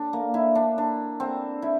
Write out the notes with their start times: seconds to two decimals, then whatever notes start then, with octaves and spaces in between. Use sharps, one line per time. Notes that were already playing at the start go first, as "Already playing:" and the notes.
Already playing: D4
0.13 A#3
0.34 E4
0.55 D4
0.78 D4
1.20 C4
1.62 E4